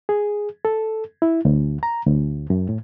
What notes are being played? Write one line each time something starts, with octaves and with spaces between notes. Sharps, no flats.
G#4
A4
E4
D2
A#5
D2
F#2
A2